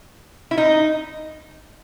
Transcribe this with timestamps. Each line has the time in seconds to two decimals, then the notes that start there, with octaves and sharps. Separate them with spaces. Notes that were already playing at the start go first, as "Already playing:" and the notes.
0.51 E4
0.58 D#4